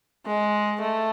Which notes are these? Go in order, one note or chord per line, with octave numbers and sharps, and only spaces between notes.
G#3
A3